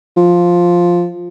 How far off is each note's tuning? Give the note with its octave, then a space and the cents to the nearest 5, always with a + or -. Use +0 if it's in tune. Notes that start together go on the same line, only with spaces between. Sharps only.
F3 +5